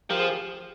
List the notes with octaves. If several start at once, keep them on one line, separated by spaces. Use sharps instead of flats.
F3 G4 A#4
G#4 C5
G4